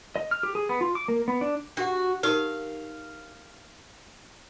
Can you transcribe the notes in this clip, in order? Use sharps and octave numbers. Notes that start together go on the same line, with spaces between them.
D#5
F6
G4
G#4
B3
F4
D6
A#3
B3
D4
D4 F#4 G4 F#5
D#4 G4 A#4 F5